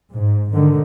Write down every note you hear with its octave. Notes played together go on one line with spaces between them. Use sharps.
G#2
G#2 D3 D#3